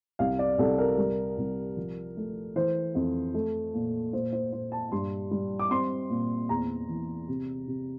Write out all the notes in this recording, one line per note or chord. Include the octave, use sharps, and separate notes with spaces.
C2 F5
D5
C2 A4
A#4
G3
C2
F3
A3
E3 C5
F2
A3
A#2
A#2 C5
C5
A#2 C5
A5
G2 C6
G3
D6
C4 C6
A#2
E2 A#5
E3
C3
C3